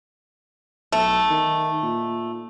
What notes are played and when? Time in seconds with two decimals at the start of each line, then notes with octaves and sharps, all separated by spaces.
0.92 B1 A3
1.30 D#3
1.83 A#2